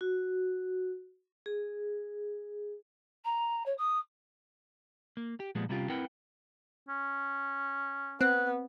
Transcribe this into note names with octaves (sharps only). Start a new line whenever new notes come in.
F#4
G#4
A#5
C#5
D#6
A#3
G4
A#2 F3 G3 G#3 B3
C3 G3 B3 C#4 F4 G4
C4 E4 A#4 B4 F#5 G5
C#4
B3 C4 F#6